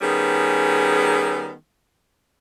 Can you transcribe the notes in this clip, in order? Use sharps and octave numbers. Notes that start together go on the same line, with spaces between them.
D#3 G3 B3 C#4 G#4